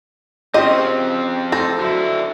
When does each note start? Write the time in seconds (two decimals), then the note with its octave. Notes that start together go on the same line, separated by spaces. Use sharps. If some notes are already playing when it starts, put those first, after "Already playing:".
0.54 C#3 C4 C#4 F4 G4 C5 D#5
0.70 F3 C4
1.52 A4 C5 A#6
1.80 D3 F#3 E4